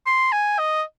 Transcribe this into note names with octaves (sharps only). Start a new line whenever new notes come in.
C6
G#5
D#5